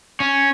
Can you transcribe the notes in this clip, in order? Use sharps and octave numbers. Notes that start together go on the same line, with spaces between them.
C#4